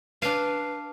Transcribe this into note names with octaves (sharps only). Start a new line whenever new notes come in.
D4 B4 F5